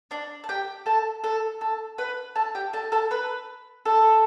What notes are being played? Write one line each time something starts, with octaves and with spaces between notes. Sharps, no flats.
D4 D5
A5
G4 G5
A4 A5
A4 A5
A4 A5
B4 B5
A4 A5
G4 G5
A4 A5
A4 A5
B4 B5
A4 A5